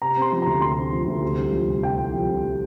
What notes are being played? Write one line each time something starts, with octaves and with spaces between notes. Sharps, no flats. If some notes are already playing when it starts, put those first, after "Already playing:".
C3 A#5
C4
C6
F3
D2 A#5
C3 C6
C4
F3
D2
C3
C2
F3
C2
C3 G5
C2
F3
C2